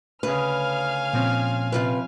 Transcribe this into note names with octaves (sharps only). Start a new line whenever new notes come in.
D2 C#3 B4 F5 G#5 F6
A#2 F3 C4 C#4
C3 F4 B4